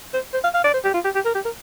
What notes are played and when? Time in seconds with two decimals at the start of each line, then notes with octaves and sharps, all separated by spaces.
0.14 C5
0.34 C5
0.44 F5
0.54 F5
0.64 D5
0.74 C5
0.84 G4
0.94 F4
1.05 G4
1.15 G4
1.25 A#4
1.35 G4
1.45 A#4